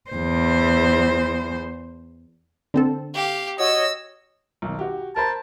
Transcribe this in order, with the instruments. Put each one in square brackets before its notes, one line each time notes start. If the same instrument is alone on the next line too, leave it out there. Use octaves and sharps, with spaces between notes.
[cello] E2 C5
[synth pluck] D3 C4 A4
[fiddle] G4 F5
[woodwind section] F#4 C#5 D#5 [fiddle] E6
[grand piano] B1 B2 D#3
F#4 G4
[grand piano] A#4 C5 B5 [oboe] A5